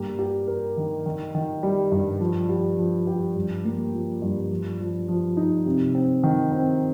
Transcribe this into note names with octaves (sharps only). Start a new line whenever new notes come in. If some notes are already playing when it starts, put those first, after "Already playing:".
Already playing: G2 A#3 G4
G4
A#4
D#3
D#3
D#3
G3
G2
F3
G4
F3
G4
G2
A#3
F3
G2
F3
F3
F3
D#4
C3
C4
D#3
C4